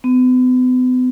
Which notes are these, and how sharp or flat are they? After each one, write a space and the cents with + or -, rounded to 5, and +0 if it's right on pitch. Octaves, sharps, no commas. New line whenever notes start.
B3 +40